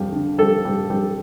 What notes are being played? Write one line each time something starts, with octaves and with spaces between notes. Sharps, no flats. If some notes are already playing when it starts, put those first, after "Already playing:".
Already playing: F2 G3
D3
G3 A4
G3
G3